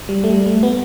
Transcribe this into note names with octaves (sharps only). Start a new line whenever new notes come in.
G3
A3
G3
A3
B3